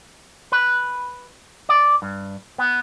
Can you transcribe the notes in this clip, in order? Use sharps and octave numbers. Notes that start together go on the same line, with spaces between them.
B4
D5
G2
B3